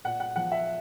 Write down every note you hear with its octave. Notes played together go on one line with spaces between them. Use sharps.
A#2 F#5
F#5
F3 F#5
E5